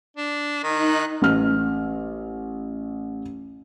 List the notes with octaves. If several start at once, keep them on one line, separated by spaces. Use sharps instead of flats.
D4
D#3 D#4 F#6
A1 F6